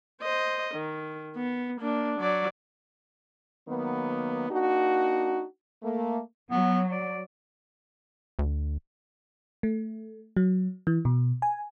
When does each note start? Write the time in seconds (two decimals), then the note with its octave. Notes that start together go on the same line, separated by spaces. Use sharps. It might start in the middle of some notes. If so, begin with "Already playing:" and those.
0.22 C5 D#5
0.74 D#3
1.37 B3
1.81 A#3 D4
2.19 F#3 D5
3.68 D#3 F#3 A#3 B3
4.49 A#3 D4 D#4 F#4
5.83 A3 A#3
6.51 F#3 B3
6.92 D5
8.39 D2
9.63 A3
10.37 F#3
10.87 E3
11.05 B2
11.42 G#5